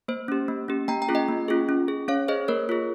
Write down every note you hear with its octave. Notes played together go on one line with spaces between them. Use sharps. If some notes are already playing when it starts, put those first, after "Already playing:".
A#3 C5
C#4 G4
A#3
C#4 G4
A#3 G5 A#5
G5 A#5
C#4 F4 G#4
D#5 G5
A#3
C#4 F4 G#4
C#4
G#4
C#4 C#5 F5
G#4 C5 D#5
A#3 A#4 C#5
F4 G#4